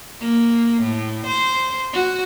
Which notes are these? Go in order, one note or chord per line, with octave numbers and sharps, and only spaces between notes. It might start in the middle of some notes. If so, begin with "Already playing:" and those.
A#3
A2
C5
F#4